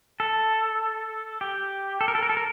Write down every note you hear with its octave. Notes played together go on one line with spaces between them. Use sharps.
A4
G4
A4
A#4
A4
A#4
A4
A#4